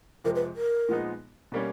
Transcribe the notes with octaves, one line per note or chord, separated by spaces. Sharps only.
F2 C3 F3 G#3 A#4
B4
A#4
A#2 F3 G#3 B3 D#4
B2 G3 A#3 C#4